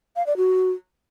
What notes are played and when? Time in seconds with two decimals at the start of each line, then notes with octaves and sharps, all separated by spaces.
0.16 F5
0.27 D5
0.37 F#4